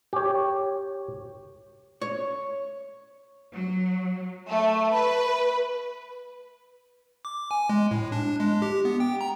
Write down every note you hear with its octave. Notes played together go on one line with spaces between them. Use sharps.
G4 C#5
C#5
F#3
A3
B4
D6
G#5
G#3
A2
D4
G#3
G4
B3
G5
A#5